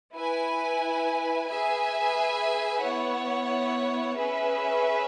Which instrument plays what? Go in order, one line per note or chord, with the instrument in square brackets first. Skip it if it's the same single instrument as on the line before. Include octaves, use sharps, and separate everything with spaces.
[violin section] E4 B4 G#5
G#4 B4 E5 G#5
B3 E4 C#5 F#5
C#4 G#4 B4 E5